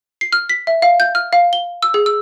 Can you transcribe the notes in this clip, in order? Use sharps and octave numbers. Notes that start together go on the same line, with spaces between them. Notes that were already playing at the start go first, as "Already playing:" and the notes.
C7
F6
B6
E5
F5
G6
F6
F5
G7
E6
G#4
E6